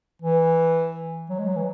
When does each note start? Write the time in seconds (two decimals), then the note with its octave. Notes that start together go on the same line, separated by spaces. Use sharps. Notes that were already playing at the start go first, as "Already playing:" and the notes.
0.22 E3
1.30 F#3
1.39 G#3
1.47 F#3
1.56 E3